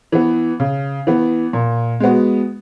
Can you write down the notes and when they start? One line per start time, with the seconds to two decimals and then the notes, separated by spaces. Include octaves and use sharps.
0.12 E3 B3
0.60 C#3
1.07 E3 B3
1.53 A#2
2.00 G#3 B3 F#4